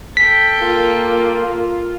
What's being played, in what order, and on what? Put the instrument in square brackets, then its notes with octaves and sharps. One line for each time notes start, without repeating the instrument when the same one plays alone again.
[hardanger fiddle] A4 G5 [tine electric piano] B6
[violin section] A#3 [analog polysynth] F4